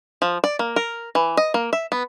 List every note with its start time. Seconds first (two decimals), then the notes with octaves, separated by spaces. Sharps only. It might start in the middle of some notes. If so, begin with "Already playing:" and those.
0.22 F3
0.44 D5
0.59 A#3
0.76 A#4
1.15 E3
1.37 D#5
1.54 A#3
1.73 E5
1.92 B3